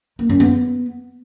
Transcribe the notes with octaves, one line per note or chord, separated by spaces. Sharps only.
A#3
F#2
B3